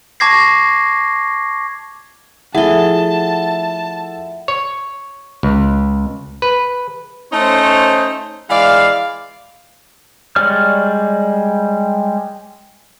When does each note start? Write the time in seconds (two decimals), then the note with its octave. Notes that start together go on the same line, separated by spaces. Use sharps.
0.20 A5 C#6 D6 G#6 A#6 C7
2.55 F3 A3 E4 G#4 E5 F#5 A5
4.48 C#5
5.43 C#2
6.42 B4
7.33 A3 C#4 D#4 C5
8.50 E3 G#3 D5 F5
10.36 G3 G#3 C#5 D5 F6